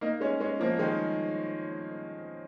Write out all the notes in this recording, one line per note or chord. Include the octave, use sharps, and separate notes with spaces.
A#3 D#4
G#3 C#4
G#3 C#4
F3 A#3
D#3 G#3